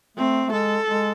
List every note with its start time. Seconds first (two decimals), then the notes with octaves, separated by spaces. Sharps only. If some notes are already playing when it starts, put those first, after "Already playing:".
0.17 A3 C4
0.48 A3
0.52 G#3 A4
0.88 G#3